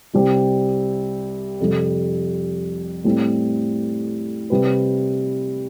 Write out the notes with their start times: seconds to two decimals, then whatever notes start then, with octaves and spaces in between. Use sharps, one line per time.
0.14 C2 C3 G3 C4 G4
1.60 F2 C3 G3
3.05 A2 G3 C4 E4
4.50 C3 G3 C4 G4 B4